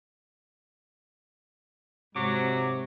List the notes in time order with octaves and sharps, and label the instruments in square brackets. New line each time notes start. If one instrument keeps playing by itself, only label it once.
[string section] G#2 [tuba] C3 [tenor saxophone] F#3 [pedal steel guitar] D6